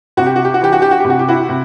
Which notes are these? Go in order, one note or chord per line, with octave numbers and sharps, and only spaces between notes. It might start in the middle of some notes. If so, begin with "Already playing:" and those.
C3 F#4
G4
F#4
G4
F#4
E3 G4
F#4
G4
F#4
C3 G4
F#4
G4
E4 F#4
C3